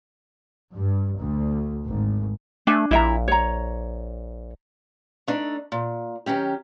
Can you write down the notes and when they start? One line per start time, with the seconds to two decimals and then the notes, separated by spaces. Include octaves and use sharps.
0.74 G2
1.19 D2
1.87 G#1
2.67 A3 D4 G#5
2.91 A#1 E4 E5 A#5
3.28 C#5 A#5
5.28 A3 D4 D#4
5.72 A#2
6.26 D#3 F#3 C#4 G4